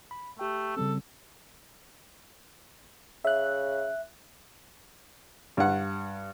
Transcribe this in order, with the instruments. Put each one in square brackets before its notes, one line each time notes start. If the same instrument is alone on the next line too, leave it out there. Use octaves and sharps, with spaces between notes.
[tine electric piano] B5
[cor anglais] A3 [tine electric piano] G4 G5
[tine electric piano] C#3 G3 C4 [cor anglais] A4
[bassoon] C#3 [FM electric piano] E5 F#6
[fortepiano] G2 F#5